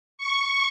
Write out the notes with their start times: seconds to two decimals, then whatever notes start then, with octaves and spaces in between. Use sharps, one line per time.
0.18 C#6